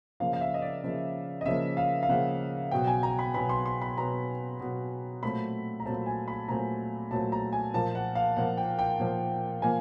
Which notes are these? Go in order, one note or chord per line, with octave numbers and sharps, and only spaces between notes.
C#3 F3 A#3 F5
F5
E5
D#5
D5
C#3 F3 A#3 D#5
D#5
C#3 F3 A#3 E5
F5
F5
C#3 F3 A#3 F#5
B2 F#3 B3 G5
G#5
A#5
B5
B2 F#3 B3 B5
C6
C6
B5
B2 F#3 B3 A#5
B2 F#3 B3
A#2 F#3 A3 C4 B5
A#5
A#2 F#3 A3 C4 A5
G#5
B5
A#2 F#3 A3 C4 A#5
A#2 F#3 A3 C4 A5
A#5
G#5
A#2 F3 A#3 A5
F#5
F5
A#2 F3 A#3 F#5
G5
G5
A#2 F3 A#3
A#2 F3 A#3 G#5